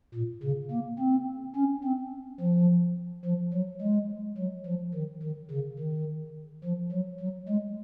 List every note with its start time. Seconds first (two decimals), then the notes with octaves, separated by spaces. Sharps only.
0.14 A#2
0.43 C#3
0.71 A#3
0.99 C4
1.55 C#4
1.84 C4
2.40 F3
3.25 F3
3.53 F#3
3.81 G#3
4.38 F#3
4.66 F3
4.94 D#3
5.22 D#3
5.50 C#3
5.79 D#3
6.64 F3
6.92 F#3
7.20 F#3
7.48 G#3